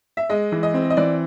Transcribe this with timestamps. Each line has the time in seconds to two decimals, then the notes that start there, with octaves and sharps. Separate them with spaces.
0.17 E5
0.29 G#3 D#5
0.52 E3
0.63 D#5
0.74 C4
0.90 D#5
0.97 E3 D5